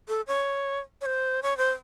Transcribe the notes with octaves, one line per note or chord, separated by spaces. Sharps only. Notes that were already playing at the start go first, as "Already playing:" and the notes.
A4
C#5
C#5
C5
C#5
C5